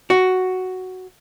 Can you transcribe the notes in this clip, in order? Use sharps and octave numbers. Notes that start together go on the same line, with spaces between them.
F#4